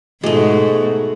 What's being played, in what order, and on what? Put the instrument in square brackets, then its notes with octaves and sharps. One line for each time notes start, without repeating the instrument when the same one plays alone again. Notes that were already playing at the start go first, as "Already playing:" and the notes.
[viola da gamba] G#2 B2 F#4 [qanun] G#3 A3